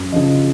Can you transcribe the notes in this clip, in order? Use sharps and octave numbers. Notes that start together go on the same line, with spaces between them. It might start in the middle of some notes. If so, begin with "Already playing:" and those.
Already playing: F#2
C#3 F3 D#5